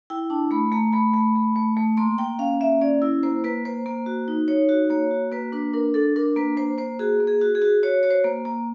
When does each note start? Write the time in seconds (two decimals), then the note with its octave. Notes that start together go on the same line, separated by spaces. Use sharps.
0.10 E4 G5
0.30 D4 A5
0.51 A3 B5
0.72 A3 A#5
0.93 A3 B5
1.14 A3
1.35 A3
1.56 A3
1.77 A3
1.97 A#3 C6
2.18 A#3 G5
2.39 C#4 F5
2.61 A#3 E5
2.81 C#4 D5
3.02 E4
3.23 A#3 C5
3.44 A#3 B4
3.65 A#3 C5
3.86 A#3
4.06 F#4
4.28 D#4
4.48 D#4 C#5
4.69 F#4
4.90 A#3 C#5
5.11 F#4
5.32 A#3 B4
5.52 D4 B4
5.73 D4 A#4
5.94 D4 A4
6.16 D4 A#4
6.36 A#3 B4
6.57 A#3 C5
6.78 A#3 C5
6.99 F#4 G#4
7.20 A#3
7.27 G#4
7.41 F#4
7.55 G#4
7.62 F#4
7.83 F#4 C#5
8.03 F#4 C#5
8.11 C5
8.24 A#3
8.45 A#3